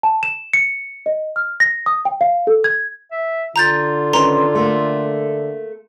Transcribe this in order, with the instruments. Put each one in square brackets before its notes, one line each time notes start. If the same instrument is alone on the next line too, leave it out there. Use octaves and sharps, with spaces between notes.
[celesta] A5
E7
C#7
D#5
F6
A#6
D#6
G5
F5
A4
G#6
[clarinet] E5
[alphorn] D3 [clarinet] F4 [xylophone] A#5 G6 A6
[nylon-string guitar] D#3 C#4 B4 [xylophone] A#5 C6
[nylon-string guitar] A3 A#3